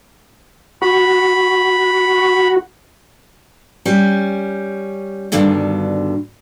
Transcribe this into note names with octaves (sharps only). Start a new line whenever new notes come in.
F#4 B5
G3 C#4
G2 B2 D3 D#3